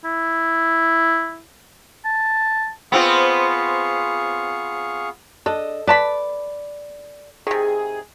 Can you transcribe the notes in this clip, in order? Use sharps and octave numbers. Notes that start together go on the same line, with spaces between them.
E4
A5
B3 C4 F4 G#4 F5 C#6
D4 A4 D#5
B4 D5 A5 B5
C3 D#3 G#4